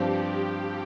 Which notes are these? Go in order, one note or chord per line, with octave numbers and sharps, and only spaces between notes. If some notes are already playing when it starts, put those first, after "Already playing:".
Already playing: G2 F3 C4 G4
G4